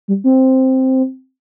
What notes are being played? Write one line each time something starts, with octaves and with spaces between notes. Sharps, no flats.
G3
C4